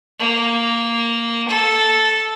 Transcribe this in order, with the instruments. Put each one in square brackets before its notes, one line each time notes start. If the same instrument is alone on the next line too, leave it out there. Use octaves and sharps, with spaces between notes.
[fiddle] A#3
A4